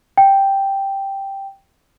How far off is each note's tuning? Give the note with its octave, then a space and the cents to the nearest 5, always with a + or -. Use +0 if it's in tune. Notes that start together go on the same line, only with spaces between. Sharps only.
G5 +0